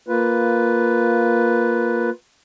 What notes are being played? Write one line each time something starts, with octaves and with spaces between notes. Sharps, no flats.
A#3 F4 B4